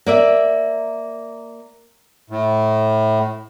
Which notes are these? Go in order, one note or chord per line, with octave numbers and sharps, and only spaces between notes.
A#3 D5 E5
A2